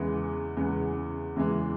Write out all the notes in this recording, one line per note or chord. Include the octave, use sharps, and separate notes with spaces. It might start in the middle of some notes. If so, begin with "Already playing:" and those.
Already playing: E2 C#3 E3 G#3 B3
E2 C#3 E3 G#3 B3
E2 C#3 E3 G#3 B3